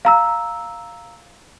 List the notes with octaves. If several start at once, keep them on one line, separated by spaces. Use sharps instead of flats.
F5 A#5 E6